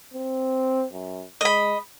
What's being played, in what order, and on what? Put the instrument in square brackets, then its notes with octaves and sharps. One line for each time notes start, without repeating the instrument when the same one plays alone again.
[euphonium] C4
F#2
[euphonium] G#3 [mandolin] D#5 B5